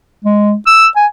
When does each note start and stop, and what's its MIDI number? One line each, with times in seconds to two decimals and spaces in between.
0.24 0.55 56
0.66 0.87 88
0.96 1.06 80